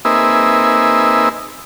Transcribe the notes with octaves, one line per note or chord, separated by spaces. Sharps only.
A#3 C4 D#4 G#4 B4 E5